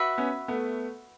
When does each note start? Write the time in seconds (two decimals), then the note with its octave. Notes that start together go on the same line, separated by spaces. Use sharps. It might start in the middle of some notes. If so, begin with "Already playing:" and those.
Already playing: F#4 B4 E5
0.18 B3 C#4
0.48 A3 B3